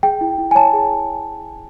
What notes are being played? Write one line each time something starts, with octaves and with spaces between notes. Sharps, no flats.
G#4 G5
E4
E4
G#5
C#5 A5
G#4